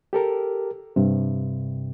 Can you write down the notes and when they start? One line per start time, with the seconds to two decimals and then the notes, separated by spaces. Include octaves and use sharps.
0.13 G4 A4 A#4
0.96 G2 C3